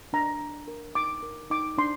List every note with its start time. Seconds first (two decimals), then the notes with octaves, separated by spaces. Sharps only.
0.13 D4 A#5
0.41 D4
0.68 A#4
0.95 D#4 D6
1.23 A#4
1.50 D#4 D6
1.78 D4 C6